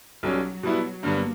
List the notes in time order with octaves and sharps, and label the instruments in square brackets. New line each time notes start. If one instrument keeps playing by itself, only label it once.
[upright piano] B1 B2 G3 C#4 [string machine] F#3
[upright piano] B2 G3 B3 E4
[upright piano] G2 D3 G3 B3 [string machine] A#3